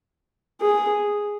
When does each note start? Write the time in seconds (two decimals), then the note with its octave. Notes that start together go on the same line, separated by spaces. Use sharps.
0.62 G#4